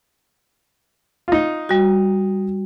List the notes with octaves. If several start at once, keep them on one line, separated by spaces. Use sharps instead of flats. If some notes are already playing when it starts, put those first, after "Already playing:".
D#4 F4
G3 F#4